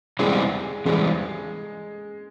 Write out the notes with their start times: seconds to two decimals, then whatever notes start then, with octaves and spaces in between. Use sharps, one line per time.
0.19 E2 C3 E3 G3 G#3 C4
0.85 E2 C3 E3 G3 G#3 C4